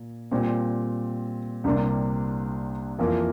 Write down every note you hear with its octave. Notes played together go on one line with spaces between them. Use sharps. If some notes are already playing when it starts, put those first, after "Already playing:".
Already playing: A#2
A#2 G3 C4
C2 C3 G3 A#3 D4
F2 E3 A#3 F4 A#4